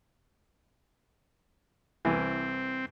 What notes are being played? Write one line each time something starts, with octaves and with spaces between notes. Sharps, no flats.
C2 E3 C4